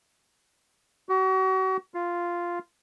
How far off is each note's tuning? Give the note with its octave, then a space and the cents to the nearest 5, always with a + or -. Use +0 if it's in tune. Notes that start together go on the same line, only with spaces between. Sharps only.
F#4 +35
F4 -5